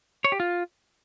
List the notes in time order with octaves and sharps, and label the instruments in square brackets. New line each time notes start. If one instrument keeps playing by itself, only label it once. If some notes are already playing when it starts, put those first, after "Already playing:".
[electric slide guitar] C#5
G4
F4